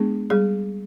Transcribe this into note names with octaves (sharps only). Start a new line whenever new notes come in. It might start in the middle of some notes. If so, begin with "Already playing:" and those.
Already playing: G#3 B3 D4 G#4
G3 G#4